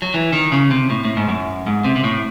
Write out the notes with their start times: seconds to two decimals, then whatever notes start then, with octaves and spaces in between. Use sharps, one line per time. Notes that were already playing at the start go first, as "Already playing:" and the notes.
0.02 F#3
0.14 E3
0.33 D#3
0.52 C#3
0.71 C3
0.90 A2
1.05 A2
1.17 G#2
1.28 F#2
1.66 G#2
1.84 C3
1.96 C3
2.04 A2